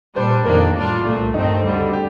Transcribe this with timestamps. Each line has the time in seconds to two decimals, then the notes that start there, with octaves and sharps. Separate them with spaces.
0.16 A#2 G3 D4 C5
0.31 C5
0.45 F2 D#3 A#3 D4 A#4
0.76 A2 G3 D4 F4
1.04 C2 A#2 A3
1.34 G2 D#3 A3 C4 D#4
1.64 D2 D3 G3
1.93 G4